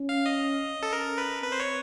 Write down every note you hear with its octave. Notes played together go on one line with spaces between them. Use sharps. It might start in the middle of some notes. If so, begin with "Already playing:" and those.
Already playing: C#4
F5
D#5
A4
C#4 A#4
B4
C4 B4
C5
C#5